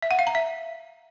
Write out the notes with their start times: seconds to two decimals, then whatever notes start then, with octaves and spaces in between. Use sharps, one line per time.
0.03 E5
0.11 F#5
0.19 F5
0.27 A#5
0.35 E5